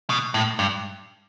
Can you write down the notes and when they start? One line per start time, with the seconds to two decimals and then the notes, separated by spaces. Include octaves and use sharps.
0.10 B2
0.34 A2
0.59 G2